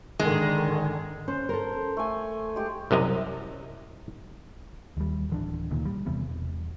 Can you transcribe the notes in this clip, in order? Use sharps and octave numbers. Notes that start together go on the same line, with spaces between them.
G#2 D3 D#3 G#3
C#4 C5
A4 A#4
A3 G#5
G#3 G4
C2 F#2 C3 D#5
D#2 G3
D1 E3 D4
F1 D2 A#2 D#3
G3
E2 C3 E3 B3
E1